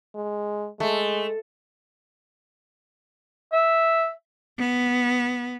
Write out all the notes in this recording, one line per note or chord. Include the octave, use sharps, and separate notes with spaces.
G#3
G#3 A3
E5
B3